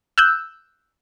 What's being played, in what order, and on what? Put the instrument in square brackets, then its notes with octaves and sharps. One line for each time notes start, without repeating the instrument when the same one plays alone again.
[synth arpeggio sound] E6 F#6 G6